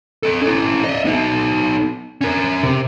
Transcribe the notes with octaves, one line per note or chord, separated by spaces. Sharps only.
A4 D#5
C#4 E4
D#5 E5
B3 D#4
C#4 A#4
C3